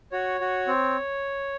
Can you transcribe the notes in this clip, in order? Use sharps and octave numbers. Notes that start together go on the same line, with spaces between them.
F#4 C#5
F#4
C4